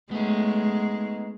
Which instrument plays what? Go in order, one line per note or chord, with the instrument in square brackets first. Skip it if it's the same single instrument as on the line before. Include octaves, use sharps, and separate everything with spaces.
[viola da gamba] G#3 [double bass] A3 [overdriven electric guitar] B3 D#4